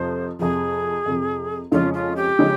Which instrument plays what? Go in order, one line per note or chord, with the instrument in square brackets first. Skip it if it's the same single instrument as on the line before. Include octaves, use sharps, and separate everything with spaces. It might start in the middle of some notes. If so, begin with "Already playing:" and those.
Already playing: [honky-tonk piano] F2 C3 F3 [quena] C5
[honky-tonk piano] F2 C3 F3 [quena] G#4
[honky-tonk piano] F2 C3 F3
[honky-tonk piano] F2 C#3 F3 G#3 C#4 [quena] F4
[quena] F4
G4
[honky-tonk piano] C#3 F3 G#3 C#4